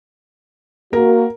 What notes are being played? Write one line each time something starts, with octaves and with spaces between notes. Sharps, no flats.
A#3 F#4 A#4